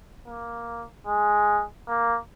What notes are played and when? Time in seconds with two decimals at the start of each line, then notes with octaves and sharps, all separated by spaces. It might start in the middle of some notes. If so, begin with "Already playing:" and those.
0.27 A#3
1.07 G#3
1.88 A#3